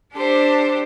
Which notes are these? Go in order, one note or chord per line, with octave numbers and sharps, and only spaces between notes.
D4 G4 A4 C5